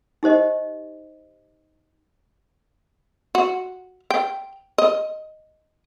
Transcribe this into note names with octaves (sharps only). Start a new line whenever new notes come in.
D#4 G4 C5 D#5
F#4
G5
D#5